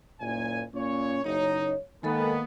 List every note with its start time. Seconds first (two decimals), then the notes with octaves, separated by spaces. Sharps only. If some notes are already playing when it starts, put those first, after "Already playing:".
0.21 F#1 A#2 G#5
0.74 A#2 C#4 C#5
1.24 F#1 D#4 C#5
2.03 D#3 G#3 A#3 B3 A4 B5